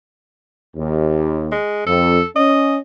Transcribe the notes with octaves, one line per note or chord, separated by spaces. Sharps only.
D#2
G#3
F2 A4
C#4 D#5